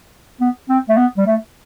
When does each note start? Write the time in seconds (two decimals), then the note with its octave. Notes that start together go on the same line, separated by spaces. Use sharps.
0.40 B3
0.69 C4
0.89 A3
0.97 B3
1.18 G3
1.27 A3